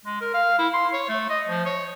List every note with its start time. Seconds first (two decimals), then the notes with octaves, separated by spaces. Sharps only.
0.05 G#3
0.21 A#4
0.34 F5
0.59 E4
0.74 C6
0.93 C#5
1.09 A3
1.30 D#5
1.48 F3
1.66 C#5